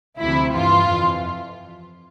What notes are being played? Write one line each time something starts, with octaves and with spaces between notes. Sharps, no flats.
D2 C3 F3 E4
G2 E3 F4
F2 E3